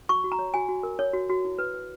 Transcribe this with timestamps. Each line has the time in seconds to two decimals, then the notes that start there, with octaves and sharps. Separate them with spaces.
0.09 F#4 C#6
0.24 F#4
0.32 A#5
0.39 C#5
0.54 F#4 G#5
0.68 F#4
0.83 A#4
0.99 C#5
1.13 F#4
1.30 F#4
1.45 E4
1.59 B4
1.74 B4